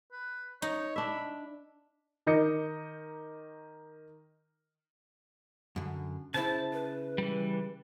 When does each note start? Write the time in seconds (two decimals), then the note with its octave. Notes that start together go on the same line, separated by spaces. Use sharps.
0.12 B4
0.62 D#4 C#5
0.96 D4 E5 B5
2.27 D#3 A#4 D#5 D6 G6 C#7
5.76 F#2 D3
6.34 C#3 E4 C5 A5
6.73 B4
7.18 E3 G3